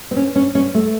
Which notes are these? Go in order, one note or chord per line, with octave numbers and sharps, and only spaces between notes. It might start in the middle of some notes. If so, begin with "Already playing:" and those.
C4
C#4
C#4
C#4
A3